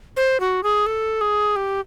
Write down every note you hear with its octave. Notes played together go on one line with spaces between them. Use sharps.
C5
F#4
G#4
A4
G#4
G4